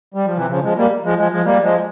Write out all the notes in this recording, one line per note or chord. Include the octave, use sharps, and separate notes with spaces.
G3
F3
C3 E3
C#3 F3
F3 G#3
G3 A#3
F3 G#3
F3 G#3
F3 G#3
G3 A#3
F3 G#3